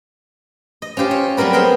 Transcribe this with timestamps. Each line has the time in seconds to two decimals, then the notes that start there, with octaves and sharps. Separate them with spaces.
0.82 D#5
0.97 C#4 F4 G4 C5
1.11 C#5
1.37 F#3 G3 C4 A#4 B4
1.53 B3 G#4 A#4 C5 G5